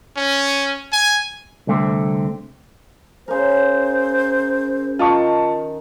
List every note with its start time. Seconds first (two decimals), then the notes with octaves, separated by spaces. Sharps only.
0.17 C#4
0.93 G#5
1.67 C2 D3 A3 C4
3.28 C#3 A#4 C5
4.99 D#3 F4 A5 C#6